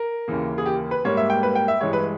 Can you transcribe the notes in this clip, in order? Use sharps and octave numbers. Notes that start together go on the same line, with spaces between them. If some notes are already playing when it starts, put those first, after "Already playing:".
Already playing: A#4
D#2 C#3 E3 A#3
G#4
G4
B4
G#2 G3 A#3 C#5
E5
G5
B4
G5
E5
G2 E3 G#3 C#5
B4